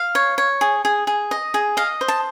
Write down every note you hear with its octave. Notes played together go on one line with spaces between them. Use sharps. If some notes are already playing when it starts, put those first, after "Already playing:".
Already playing: F5
C#5
C#5
G#4
G#4
G#4
D#5
G#4
D#5 F5
C5
A5